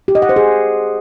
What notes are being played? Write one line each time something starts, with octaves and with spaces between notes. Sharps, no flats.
G4
D#5
F#5
C5
G#4